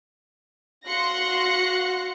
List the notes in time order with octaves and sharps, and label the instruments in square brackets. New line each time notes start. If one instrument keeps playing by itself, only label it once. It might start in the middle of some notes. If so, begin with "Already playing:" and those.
[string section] F#4 F5 C6 F#6 A#6 C#7